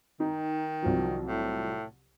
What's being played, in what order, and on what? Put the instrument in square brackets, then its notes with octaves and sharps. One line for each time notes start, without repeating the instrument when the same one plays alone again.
[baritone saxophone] D#3 [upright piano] D#4
[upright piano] C2 F3 F#3
[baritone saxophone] A2